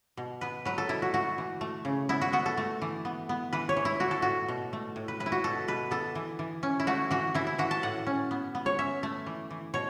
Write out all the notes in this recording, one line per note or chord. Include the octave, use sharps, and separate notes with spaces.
B2
B3 B4
F#3 B4
A4
B2 E4
F#4
A3 F#4
E3
A3
C#3
B3 E4
F#4
B3 F#4
A4
A3
E3
B3
B3
E3 B4
C#5
E3
E4
A3 F#4
A4
A2 F#4
B2
A3
A2
B4
A2 B4
E4
F#4
B2 A4
B2 B4
B3 A4
E3
E3
C#4
E4
A3 F#4
E3 F#4
E3 E4
E4
E3 F#4
A5
A2 F#5
C#4
B3
B3
C#5
C#4 E5
A3
E3
E3
B2 C#5